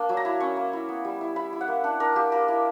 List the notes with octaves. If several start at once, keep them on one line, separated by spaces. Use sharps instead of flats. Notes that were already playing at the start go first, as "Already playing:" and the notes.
Already playing: A#3 D4
F#3
A#5
E4
C#4 C#6
A#3
E4
B3
G3
E4
E4 B5
E4
F#5
A#3
D4 F#5
D4 A#4
A#3 G4
A#3 A#4
E4